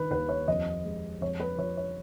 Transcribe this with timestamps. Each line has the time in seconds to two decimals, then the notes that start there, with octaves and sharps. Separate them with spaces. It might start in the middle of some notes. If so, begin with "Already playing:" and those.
Already playing: D#3 B4
0.11 D#2 B4
0.29 C#5
0.48 F2 D#5
0.85 G#3
1.21 F2 C#5
1.40 B4
1.58 F3 C#5
1.77 C#5